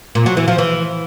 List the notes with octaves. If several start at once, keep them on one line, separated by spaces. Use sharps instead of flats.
A#2
F#3
E3
F3
E3